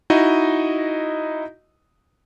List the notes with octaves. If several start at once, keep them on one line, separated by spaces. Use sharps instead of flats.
D#4 E4 F#4 D#5